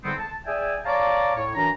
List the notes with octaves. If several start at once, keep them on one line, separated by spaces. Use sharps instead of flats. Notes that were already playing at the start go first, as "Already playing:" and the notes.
G#2 D3 G3 B3 C4
A5
G#4 D5 E5 G5 G#5
C#5 D5 F5 A5 A#5 D6
A2 C#5
F#2 E3 D4 A#5